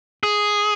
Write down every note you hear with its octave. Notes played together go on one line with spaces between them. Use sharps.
G#4